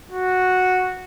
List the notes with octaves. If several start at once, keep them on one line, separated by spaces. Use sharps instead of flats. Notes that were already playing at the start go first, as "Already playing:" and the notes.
F#4